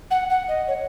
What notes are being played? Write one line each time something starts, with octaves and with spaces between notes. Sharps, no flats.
F#5
F#5
D#5
C#5